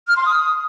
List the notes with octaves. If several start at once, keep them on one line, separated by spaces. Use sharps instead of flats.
F6
C6
D#6